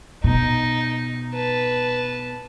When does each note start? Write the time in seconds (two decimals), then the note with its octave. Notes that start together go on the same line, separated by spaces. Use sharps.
0.24 B2 D#4
1.34 B4 A5